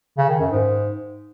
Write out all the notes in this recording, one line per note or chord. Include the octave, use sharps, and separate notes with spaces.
C#3
D#3
F#2
G#2